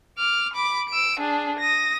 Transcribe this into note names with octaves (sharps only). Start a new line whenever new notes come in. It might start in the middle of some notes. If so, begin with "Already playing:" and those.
D6 F6
B5 D6
E6 D7
D4 G#4
D#6 A#6